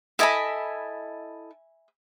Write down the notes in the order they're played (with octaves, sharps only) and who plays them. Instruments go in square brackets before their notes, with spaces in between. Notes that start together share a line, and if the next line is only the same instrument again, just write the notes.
[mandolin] E4 A4 D#5 [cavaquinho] E5 G#5 B5